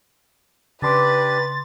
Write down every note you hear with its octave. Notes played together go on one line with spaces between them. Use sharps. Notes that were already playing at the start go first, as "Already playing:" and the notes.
C#3 D4 G4 B4 C6 D6 A6